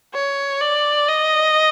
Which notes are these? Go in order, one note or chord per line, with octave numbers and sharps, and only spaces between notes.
C#5
D5
D#5